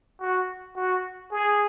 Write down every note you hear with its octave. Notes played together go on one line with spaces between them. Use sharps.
F#4
F#4
G#4